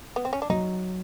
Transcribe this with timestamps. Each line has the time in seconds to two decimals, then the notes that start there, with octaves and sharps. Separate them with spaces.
0.16 B3
0.25 C4
0.33 C#4
0.42 D4
0.50 F#3 D#4